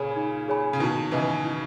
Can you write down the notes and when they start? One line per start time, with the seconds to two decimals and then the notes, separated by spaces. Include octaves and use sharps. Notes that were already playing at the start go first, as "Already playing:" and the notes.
Already playing: A#2 C#3 G#4 C#5 G#5 B5
0.16 D#4
0.48 G#4 C#5 G#5 B5
0.73 C#3
0.80 B2 D#3 E4
1.11 C#3 E3 B4 D#5 G#5
1.44 E4